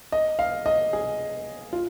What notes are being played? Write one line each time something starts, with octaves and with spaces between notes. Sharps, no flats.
D#5
F5
D#5
G#4
F4